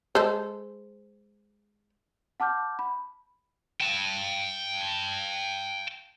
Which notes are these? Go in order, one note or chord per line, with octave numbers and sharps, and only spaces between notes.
G#3 A4 C5
F#5 A5 D6 F6 G6
B5
G5 A5